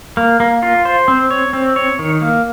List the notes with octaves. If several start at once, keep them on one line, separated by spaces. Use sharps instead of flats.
A#3
A#3
F4
C5
C4
C#5
C4
C#5
D#3
A#3